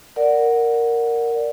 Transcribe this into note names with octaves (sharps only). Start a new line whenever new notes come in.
A#4 D5 F#5